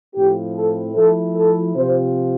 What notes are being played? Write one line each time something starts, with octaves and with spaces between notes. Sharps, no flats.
A2 F3 C4 E4 G4
A4
F3 A3 E4 A4
A4
C3 F3 C4 F4 C5